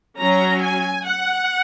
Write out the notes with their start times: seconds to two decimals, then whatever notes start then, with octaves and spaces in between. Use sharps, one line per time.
0.19 F#3 C#4 A#5
0.62 G#5
1.06 F#5